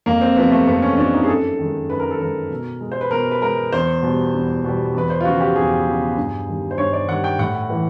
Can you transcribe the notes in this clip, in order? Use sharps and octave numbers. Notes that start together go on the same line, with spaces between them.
F2 A#3
C4
C3 F3 A3 B3
A3
F2 B3
C#4
C3 F3 A3 D4
D#4
G#4
F#2 A4
D#3 G#3
F#2 B4
A#4
A4
D#3 G#3 A#4
B2
G#3
C5
B4
B2 A#4
B4
G#3 A#4
E2 C5
B2 G3
E2
B2 G3
E2 B4
C5
F4
C#3 F3 F#4
G4
E2 G#4
C#3 F3
G2
D#3 G3
C5
G2 C#5
D5
D#3 G3 F#5
G5
A2 F#5
E3 A3